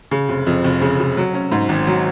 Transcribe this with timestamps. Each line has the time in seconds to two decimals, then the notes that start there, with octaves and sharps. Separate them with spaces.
0.11 C#3
0.29 F1
0.47 F2
0.64 F1
0.81 C#3
1.00 F1
1.17 F#3
1.34 C#4
1.52 G#2
1.69 G#1
1.87 F#3